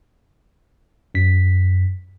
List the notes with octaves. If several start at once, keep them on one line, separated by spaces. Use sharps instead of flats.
F#2 B6